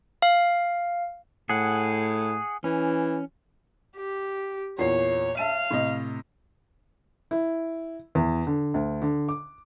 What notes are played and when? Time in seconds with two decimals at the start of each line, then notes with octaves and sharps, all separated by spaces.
0.22 F5
1.49 A2 G#4 F#5
2.64 E3 C#4
3.96 G4
4.78 E2 A#2 C#5 C7
5.37 E5 F5 A5 D#7
5.71 A2 C3 D#5
7.31 E4
8.15 E2
8.47 D3
8.74 D2
9.02 D3
9.29 D6